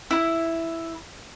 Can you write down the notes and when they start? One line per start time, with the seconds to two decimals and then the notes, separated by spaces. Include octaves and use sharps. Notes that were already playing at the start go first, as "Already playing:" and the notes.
0.11 E4